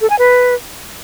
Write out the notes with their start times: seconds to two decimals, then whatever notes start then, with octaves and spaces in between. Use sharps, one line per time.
0.01 A4
0.10 G#5
0.19 B4